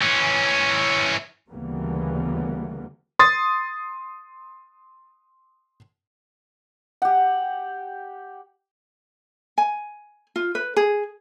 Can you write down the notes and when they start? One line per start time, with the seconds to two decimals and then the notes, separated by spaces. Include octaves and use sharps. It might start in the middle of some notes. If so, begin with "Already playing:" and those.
0.02 E3 C#4
1.50 D2 C#3 E3 G3 A#3 B3
3.19 C6 D#6 A6
7.02 G4 F#5
9.58 G#5
10.36 F4
10.55 B4
10.77 G#4